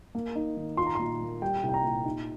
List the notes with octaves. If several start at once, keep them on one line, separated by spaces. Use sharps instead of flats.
A#3
D#4
D#3
F4 C6
A#5
A#2 C6
A#3
G3 G5
C2
G5
A#5
A#2
D#4